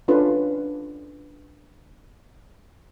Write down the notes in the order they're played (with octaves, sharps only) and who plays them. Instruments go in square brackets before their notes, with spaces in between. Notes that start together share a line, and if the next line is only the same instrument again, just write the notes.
[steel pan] C#4 D4 F4 A4 B4